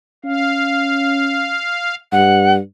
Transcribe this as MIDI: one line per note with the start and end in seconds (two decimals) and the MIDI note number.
0.25 1.58 61
0.25 1.95 77
2.12 2.58 43
2.12 2.53 78